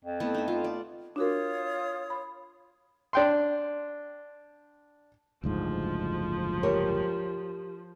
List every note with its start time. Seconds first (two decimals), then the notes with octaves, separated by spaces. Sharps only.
0.05 F2
0.20 A3 B3 E4
0.34 D#4 E5
0.48 F4
0.64 D5
1.16 D4 F4 F#4 A#4 C#5 D#6
2.10 B5
3.13 D4 G5 C6
5.44 F#1 D2 G#2 F3
6.63 G4 A#4 C#5